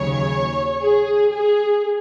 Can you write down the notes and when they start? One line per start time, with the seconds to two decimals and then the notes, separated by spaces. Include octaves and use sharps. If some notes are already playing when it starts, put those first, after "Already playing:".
Already playing: D#2 C#3 F#3 C#5
0.80 G#4
1.31 G#4